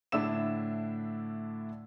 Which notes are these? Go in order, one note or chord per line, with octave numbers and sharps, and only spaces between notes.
A2 D3 D4 E4 E6 E7